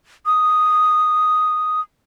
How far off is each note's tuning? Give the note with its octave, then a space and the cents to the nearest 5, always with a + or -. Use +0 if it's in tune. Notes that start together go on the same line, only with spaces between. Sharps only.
D#6 +0